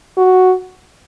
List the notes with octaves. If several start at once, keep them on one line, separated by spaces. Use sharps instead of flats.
F#4